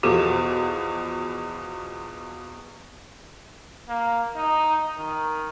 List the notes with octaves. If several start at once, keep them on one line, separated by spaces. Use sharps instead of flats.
E2 B2 F3 F#4 G4 A4
A#3
D#4
D#3